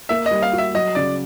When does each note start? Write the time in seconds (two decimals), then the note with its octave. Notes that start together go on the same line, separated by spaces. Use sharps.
0.09 A#3 E5
0.26 D#5
0.31 G3
0.42 F5
0.53 F#4
0.58 E5
0.74 F#3 D#5
0.95 C#3 D5